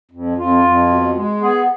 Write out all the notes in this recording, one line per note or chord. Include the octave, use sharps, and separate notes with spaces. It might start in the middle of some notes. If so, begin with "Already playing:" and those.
F2
F2 F4
F2
B2
G#3
B3 G#4